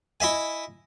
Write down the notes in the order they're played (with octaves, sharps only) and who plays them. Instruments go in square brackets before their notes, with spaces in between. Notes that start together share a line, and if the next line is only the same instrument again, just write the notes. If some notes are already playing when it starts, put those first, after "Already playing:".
[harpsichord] E4 D#5 E5 G#5